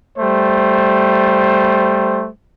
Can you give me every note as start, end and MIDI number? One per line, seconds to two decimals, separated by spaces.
0.18 2.27 55
0.18 2.27 57
0.18 2.27 72